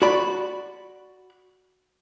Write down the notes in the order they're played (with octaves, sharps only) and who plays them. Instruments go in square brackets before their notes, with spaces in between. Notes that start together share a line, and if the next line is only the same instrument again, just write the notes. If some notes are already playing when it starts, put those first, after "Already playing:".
[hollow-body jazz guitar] F#4 D5 B5